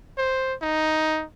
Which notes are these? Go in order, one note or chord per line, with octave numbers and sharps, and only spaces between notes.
C5
D#4